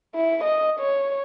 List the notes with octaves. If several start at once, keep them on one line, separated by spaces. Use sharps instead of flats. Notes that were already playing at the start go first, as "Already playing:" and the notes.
E4
D#5
C#5